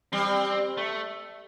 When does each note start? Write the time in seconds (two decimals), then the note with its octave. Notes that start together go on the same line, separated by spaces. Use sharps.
0.13 G3 C4
0.77 A3